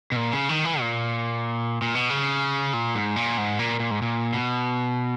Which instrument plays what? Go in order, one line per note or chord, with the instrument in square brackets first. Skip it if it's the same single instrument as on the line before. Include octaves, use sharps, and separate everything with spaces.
[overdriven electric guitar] B2
A#2
C#3
D#3
E3
A#2
A#2
B2
C#3
A#2
G#2
A#2
G#2
A#2
A#2
G#2
A#2
B2